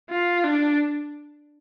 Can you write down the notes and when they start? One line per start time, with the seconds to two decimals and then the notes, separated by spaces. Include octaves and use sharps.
0.10 F4
0.44 D4